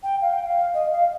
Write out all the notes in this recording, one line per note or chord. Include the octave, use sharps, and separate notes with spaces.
G5
F5
G5
F5
D#5
F5